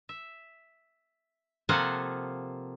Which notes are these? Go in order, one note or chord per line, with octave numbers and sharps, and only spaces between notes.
E5
C3 F3 A#3 A4 F#5 G#5